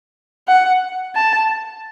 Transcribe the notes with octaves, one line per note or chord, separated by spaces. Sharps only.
F#5
A5